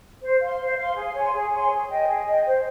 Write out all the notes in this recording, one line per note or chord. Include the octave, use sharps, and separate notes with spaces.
C5
F5 C6
C5
F5 C6
G#4
C#5 G#5 C6
G#4
C#5 G#5 C6
G#4
D#5 G5
G#4
D#5 G5
C5